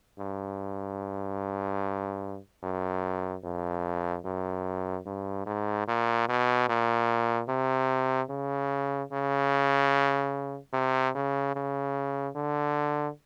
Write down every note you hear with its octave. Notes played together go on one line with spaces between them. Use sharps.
G2
F#2
F2
F#2
G2
G#2
A#2
B2
A#2
C3
C#3
C#3
C3
C#3
C#3
D3